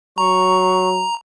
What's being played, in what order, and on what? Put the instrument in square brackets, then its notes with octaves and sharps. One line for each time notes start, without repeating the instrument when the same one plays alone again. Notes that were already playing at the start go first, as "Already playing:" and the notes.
[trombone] F#3 [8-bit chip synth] A#5 [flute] C#6